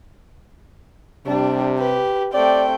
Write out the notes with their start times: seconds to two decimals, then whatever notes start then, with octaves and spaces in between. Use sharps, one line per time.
1.26 C3 G3 D4
1.79 G4 B4
2.34 A3 C4 D5 G5